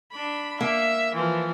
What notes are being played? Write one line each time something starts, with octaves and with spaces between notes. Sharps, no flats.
D4 B5
A#3 E5
E3 F3